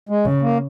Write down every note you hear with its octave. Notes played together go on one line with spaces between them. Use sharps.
G#3
C#3
A#3